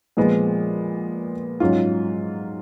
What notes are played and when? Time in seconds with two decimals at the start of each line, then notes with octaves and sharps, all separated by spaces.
0.17 A#2 F3 G#3 B3
1.60 G#2 F#3 C#4 F4